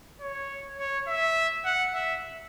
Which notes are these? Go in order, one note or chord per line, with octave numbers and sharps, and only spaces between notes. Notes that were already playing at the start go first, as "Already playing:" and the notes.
C#5
C#5
E5
F#5
E5